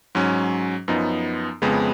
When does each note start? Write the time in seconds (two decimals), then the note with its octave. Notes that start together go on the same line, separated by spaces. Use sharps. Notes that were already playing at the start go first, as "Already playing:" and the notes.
0.15 G#2 F#3 C#4
0.88 F#2 F3 B3 D#4
1.62 F2 C#3 G#3 B3